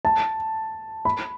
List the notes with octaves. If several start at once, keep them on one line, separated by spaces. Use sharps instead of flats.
A5
B5